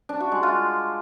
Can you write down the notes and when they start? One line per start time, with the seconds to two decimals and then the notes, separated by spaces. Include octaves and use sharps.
0.09 D4
0.20 F#4
0.32 G#3
0.43 F4